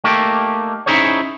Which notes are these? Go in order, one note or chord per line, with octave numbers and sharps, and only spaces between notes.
A3 A#3 D#4 G4
C#4 D#4 E4 G#4 C5 C#5